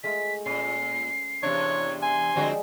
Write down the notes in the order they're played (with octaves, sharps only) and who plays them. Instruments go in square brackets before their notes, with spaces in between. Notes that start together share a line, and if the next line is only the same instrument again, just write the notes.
[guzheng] G#3 A3 F4 [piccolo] B6
[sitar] A#2 [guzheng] C#4 D#5 [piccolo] C7
[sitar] E2 C3 D4 [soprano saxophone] C#5
[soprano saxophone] G#5 [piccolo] C6
[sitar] D3 C4 F#4 [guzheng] F3 G3 G#3